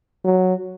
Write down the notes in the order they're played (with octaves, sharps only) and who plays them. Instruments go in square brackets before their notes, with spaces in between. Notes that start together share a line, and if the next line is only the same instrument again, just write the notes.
[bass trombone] F#3